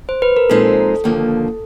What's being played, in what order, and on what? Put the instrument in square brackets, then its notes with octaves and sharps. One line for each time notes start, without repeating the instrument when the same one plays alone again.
[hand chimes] C5
B4
A#4
[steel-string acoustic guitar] A#2 F3 G#3 C4 D#4 [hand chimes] A4
[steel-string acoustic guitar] D#2 D3 F3 A#3